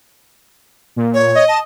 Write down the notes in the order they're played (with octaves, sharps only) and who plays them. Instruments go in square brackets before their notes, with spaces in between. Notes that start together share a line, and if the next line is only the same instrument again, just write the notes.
[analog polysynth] A#2
[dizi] C#5
[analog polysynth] D#5
[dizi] A5